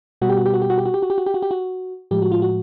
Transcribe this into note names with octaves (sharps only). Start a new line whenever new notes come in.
B2 G3 B3 F#4
G4
F#4
G4
F#4
G4
F#4
G4
F#4
G4
F#4
G4
F#4
G4
F#4
G4
F#4
A2 F3 G#3 G4
F#4
F4
F#4